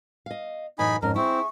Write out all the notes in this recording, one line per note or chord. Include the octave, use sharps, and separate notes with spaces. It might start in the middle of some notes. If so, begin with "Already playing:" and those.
D#5 F5
F#2 A2 E3 D#4 G#5 B5
F2 G#2 C#4 A#4
C4 E4 G#4 E5 C#6